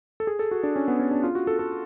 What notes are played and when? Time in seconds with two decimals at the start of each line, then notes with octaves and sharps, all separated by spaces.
0.20 A4
0.27 G#4
0.39 A4
0.51 F#4
0.63 D4
0.76 C#4
0.88 B3
1.00 C#4
1.11 D4
1.23 F4
1.35 F#4
1.47 A4
1.59 A4